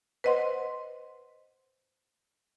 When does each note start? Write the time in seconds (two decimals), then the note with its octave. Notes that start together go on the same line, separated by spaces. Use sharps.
0.24 B4 C5 D#5 F#5 C6